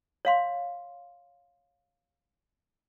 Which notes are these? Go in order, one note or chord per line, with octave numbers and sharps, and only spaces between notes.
C#5 F5 C6